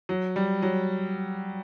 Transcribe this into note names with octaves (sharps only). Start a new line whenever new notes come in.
F#3
G3
F#3